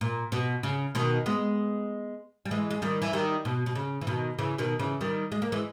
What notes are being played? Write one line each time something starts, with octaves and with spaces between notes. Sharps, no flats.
A#2
B2
C#3
B2 D#3
G#3 B3
G3
E3 G#3
G#3
D#3 G3
E3
D#3 G3
B2
B2
C#3
E3
B2 D#3
C#3 E3
B2 D#3
C#3 E3
D#3 G3
G#3
A#3
E3 G#3